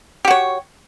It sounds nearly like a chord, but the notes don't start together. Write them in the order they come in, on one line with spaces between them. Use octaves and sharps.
G4 F#4 C#5